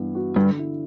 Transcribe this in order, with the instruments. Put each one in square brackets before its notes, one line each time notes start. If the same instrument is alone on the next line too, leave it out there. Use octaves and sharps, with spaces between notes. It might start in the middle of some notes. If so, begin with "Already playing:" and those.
Already playing: [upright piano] G2 E3 B3 E4
F#4
[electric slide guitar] G2 [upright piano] D3
[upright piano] E4